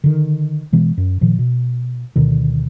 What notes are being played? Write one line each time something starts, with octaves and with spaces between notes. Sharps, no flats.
D3 D#3
B2 E3 G#3 B3
F#2
A#2 D#3 F3
B2
D2 B2 D3 D#3